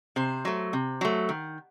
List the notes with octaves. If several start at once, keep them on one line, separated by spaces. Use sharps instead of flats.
C3 C5
F#3 A3
C3
F#3 A3
D#3